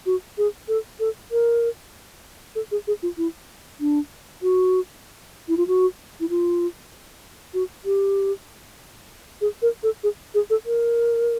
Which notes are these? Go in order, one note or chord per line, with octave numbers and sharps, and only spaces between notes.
F#4
G#4
A4
A4
A#4
A4
G#4
G#4
F4
E4
D4
F#4
E4
F4
F#4
E4
F4
F#4
G4
G#4
A#4
A4
G#4
G#4
A4
A#4